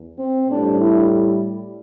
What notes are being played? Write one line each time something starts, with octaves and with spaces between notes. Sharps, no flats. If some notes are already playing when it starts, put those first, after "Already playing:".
Already playing: E2
C4
A2 G3 D4
E4